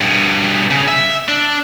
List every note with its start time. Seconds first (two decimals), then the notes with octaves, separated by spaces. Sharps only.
0.01 G2 B2
0.71 C#3
0.88 E5
1.28 D4